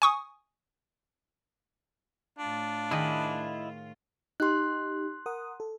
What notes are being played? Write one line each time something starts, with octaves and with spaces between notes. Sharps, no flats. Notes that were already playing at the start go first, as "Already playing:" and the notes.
G#5 C#6 D#6
A2 D4 F4
D#3 E4 G#4 D#5 B5
D#4 G4 C6 F#6
A#4 F#5 D#6
A4